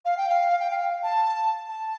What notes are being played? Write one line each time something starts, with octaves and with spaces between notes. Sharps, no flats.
F5
G5
F5
G5
F5
A5
A5